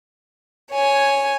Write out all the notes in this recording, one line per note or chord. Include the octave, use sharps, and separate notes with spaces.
C#5 G#5